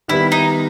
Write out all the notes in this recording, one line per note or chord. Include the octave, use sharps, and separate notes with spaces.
D#3 G3 B3 E4 G4
D#4